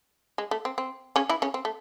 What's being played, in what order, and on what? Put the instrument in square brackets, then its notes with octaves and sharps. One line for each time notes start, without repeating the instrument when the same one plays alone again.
[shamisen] G#3
A3
C4
C4
C#3 C#4
E3 E4
C#3 C#4
C4
A3